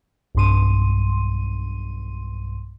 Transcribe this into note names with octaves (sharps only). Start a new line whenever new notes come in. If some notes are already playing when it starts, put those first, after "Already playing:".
B1 G2 C6 D#7